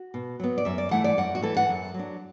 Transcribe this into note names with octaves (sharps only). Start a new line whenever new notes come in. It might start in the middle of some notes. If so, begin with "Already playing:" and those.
Already playing: F#4
B2
F#3 B3
D5
F#2 E5
D5
E3 A3 E4 F#5
D5
F#2 F#5
F#4
E3 A3 E4 A4
F#5
F#2
F#3 D4